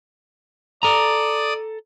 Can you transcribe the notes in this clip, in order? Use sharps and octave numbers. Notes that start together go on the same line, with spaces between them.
A4 D5 A#5 D#6